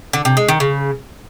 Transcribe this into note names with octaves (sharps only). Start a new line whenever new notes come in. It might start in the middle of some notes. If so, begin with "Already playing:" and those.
D3
C3
G#3
D#3
C#3